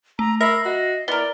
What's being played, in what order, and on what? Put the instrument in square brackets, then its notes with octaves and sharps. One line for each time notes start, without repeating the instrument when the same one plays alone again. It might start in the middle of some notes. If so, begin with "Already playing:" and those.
[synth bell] A3 [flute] A#5
[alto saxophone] A#4 [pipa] E5 [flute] B5 [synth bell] A#6 C7
[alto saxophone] F#4 [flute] D#5
[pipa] B3 A#4 [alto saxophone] E4 [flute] D5 [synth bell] G7